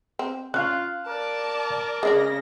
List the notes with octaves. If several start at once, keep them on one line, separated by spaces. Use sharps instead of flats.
C4
C#4 D4 F4 F5 F6 F#6
A#4 D5 A5 D6
C#3 G#3 D4 D5 A#6